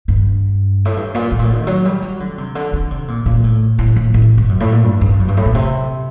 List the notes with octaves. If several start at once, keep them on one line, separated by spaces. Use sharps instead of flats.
G2
A2
G2
A#2
A2
A#2
A2
D#3
F#3
G3
F#3
D3
C3
D3
D3
C3
A#2
A#2
A2
A2
A2
A2
G2
F#2
A2
A#2
G2
G2
F#2
G2
A2
A#2
C3